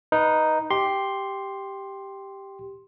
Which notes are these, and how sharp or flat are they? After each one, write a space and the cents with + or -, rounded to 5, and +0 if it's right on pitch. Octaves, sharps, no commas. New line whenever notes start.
D#4 +0 B4 -15
G4 +0 C6 +5